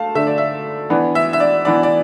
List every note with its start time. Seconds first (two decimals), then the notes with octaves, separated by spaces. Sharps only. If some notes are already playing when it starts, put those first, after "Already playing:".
Already playing: A3 F5 A5
0.15 D3 A3 D4 E5
0.27 D5
0.38 E5
0.90 E3 B3 D4
1.15 E5
1.33 E5
1.40 D5
1.65 E3 B3 D4 D5
1.83 D5